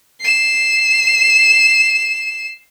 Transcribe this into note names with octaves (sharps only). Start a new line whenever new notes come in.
C7 E7